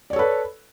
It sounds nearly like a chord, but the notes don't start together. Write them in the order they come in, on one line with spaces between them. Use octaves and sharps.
D5 C#5 A4 B4